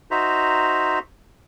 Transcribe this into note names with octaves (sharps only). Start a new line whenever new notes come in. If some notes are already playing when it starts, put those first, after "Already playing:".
D#4 F#4 C5 E5 A#5